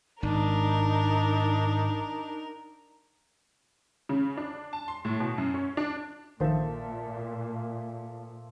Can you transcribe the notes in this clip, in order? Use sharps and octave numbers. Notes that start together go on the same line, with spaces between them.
G#1 D4 D#4 A#4
C#3
D4
A5
C6
A2
B2
F#2
C#4
D4
A#1 A#2 D#3 F3 A4 C5 E5